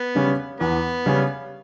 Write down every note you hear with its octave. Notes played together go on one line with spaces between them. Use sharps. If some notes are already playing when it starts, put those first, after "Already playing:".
Already playing: B3
C#3 G3 C#4
E2 B3
C#3 G3 C#4